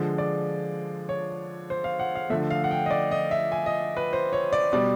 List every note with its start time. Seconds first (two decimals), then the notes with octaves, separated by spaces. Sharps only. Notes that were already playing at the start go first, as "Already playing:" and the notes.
Already playing: D3 F3 G#3
0.18 D5
1.09 C#5
1.70 C5
1.84 F5
1.99 F#5
2.15 F5
2.30 D3 F3 A3 E5
2.50 F5
2.64 F#5
2.71 G5
2.86 D#5
2.91 D5
3.11 D#5
3.31 E5
3.52 G#5
3.66 D#5
3.97 B4
4.13 C5
4.33 C#5
4.53 D5
4.73 B2 G3 D5